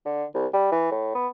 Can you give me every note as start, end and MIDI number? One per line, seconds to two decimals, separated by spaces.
0.05 0.24 50
0.34 0.46 36
0.53 0.68 55
0.72 0.90 52
0.92 1.14 45
1.15 1.28 59